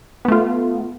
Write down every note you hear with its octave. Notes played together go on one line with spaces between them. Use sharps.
A3 B3 F4